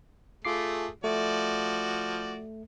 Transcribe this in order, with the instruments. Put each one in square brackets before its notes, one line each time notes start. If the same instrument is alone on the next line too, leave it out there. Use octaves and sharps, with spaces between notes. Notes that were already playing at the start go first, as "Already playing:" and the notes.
[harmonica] A3 G#4 [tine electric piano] F4 D6 C7
[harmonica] F3 F#4 D5 [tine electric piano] A3